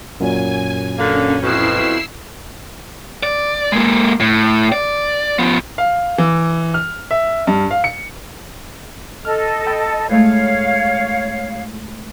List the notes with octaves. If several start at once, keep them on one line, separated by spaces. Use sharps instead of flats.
F#2 A#2 F#3 G#5
D3 A#3 C#4
F2 B2 E4 E6 C7
D5
G#3 A#3
A2
D5
F3 B3
F5
E3
F6
E5
G2
F5
C#7
A4 D#5 F6
G5 B5
A2 G#3 A3 C#5 F5